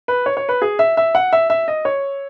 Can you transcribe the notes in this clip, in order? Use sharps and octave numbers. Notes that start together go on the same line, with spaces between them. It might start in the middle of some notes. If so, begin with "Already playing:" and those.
B4
C#5
C#5
B4
G#4
E5
E5
F#5
E5
E5
D#5
C#5